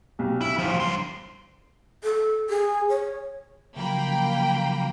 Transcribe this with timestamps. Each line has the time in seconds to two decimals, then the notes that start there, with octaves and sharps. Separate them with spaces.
0.19 B1 G4
0.41 E4
0.59 A2 F3
0.80 G2 C6
2.03 A4
2.49 G#4
2.89 C#5
3.76 C#3 F3 F#3 A#3 G5 B5